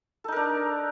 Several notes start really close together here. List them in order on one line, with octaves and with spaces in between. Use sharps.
A4 D#4 A#4 D4